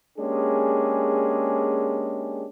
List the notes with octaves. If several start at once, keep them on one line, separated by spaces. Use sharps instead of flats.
G#3 A#3 C#4 D4 G4 G#4